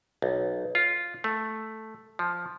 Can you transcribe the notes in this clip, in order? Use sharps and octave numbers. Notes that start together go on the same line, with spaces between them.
B1
F4
A3
F3